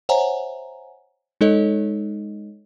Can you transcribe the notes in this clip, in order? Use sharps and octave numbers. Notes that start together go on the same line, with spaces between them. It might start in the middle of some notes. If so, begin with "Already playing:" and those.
C5 C#5 E5 F#5 G#5 A#5
G#3 D#4 A4 C#5 D#5